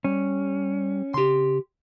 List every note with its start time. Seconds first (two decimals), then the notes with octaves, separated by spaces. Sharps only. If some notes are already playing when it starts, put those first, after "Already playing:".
0.04 G3 C#4
1.14 C#3 G4 C6